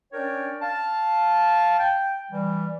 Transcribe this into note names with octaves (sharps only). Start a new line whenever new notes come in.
C#4 D4 A#4 C#5 D5 G5
F5 A5
G5
E3 G3